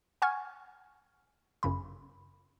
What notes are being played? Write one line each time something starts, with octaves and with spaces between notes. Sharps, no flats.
F#5 G#5 C#6 F6 G#6
G1 F#2 C#3 B5